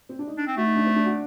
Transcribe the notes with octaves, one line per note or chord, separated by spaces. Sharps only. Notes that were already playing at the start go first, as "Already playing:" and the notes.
C4
D4
D#4
D4
C4
A3 F#4
D#4
D4
C4
D4
F#4